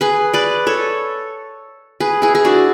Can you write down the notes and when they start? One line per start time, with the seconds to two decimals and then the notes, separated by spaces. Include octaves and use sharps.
0.01 G#4 B4
0.33 B4 D5
0.67 A4 C#5
2.00 G#4 B4
2.22 E4 G#4
2.35 G#4
2.45 D4 F#4